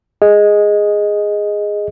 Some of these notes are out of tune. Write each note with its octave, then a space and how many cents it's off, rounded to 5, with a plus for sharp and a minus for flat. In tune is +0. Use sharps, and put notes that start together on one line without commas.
G#4 -5 D#5 +0